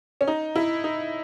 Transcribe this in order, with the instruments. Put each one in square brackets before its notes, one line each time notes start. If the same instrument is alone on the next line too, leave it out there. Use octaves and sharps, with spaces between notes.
[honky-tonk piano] C#4
D#4
E4
D#4